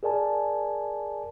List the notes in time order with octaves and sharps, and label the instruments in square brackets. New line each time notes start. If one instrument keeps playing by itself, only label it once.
[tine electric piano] G#4 A#4 D5 G#5 A5